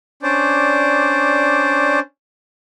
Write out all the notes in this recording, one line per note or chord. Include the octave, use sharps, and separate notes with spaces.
C#4 D4 C5 D5